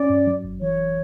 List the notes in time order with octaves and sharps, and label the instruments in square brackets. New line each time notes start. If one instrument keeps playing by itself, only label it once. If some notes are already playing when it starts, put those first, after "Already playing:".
Already playing: [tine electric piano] C#4 [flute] D5
[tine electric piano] G2
F#3
G1
[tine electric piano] E3 [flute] C#5